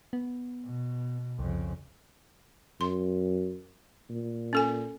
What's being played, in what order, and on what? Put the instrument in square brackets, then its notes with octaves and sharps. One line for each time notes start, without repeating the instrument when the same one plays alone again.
[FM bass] B3
[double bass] B2
[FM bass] C2 [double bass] F2 C#3
[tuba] F#2 [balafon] C6
[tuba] A#2
[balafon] C#4 A4 G#5